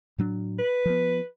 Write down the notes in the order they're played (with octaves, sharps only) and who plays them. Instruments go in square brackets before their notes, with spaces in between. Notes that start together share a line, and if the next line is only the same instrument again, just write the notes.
[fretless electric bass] A2 F#3 D4
[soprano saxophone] B4
[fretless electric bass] F3 B3